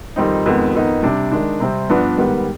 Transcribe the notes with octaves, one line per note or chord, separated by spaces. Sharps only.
F2 D#3 G3 C4 D#4
F2 D#3 G#3 B3
F2 D#3 B3 D#4
C3 G3 D4
D#3 G#3 D4
C3 G3 C4
G2 F3 B3 D4
G#2 D#3 G3 B3